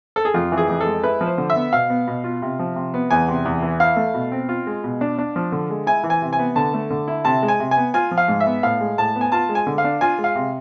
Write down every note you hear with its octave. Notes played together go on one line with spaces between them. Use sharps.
A4
G#4
F2 F4
E3
G#4
F2
A4
G#3
E4 B4
F3
C5
D3
E5
B3
B2 F5
B3
B2
F4
C3
F3
C3
B3
E2 G#5
C3
E2
E3
E4 F5
A3
B2
C4
F4
G#3
B2
D4
D4
F3
D3
G#3
E4 G#5
E3
G#5
C3
G#5
B3
D3 A5
A3
D3
E4
C3 A5
G#3
G#5
C3
G#5
B3
F4 G#5
F3
F5
G#2
E5
B3
A2 F5
G#3
A2 A5
B3
G#5
F4 A5
G#3
G#5
D3
F5
D4
F4 G#5
G#3
F5
C3